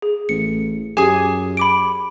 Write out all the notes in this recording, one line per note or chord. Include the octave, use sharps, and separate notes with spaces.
G#4
A1 C#7
F#2 G4 G#4 G#5
B5 D6 D7